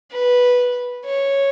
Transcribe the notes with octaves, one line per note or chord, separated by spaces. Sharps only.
B4
C#5